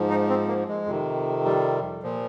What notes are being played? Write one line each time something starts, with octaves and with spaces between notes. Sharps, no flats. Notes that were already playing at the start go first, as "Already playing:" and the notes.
Already playing: G#2 F3
D#4
C4
A#3
G#3
F2 C3 D#3
G3
A#2 F3